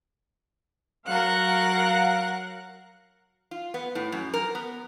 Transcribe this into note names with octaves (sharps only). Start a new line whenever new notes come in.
F#3 A#4 F5 F#5 F#6
F4
B3
A2
F#2
A#4
B3